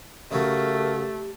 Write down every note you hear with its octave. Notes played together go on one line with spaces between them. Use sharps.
C#3 F#3 A3 G4 A#4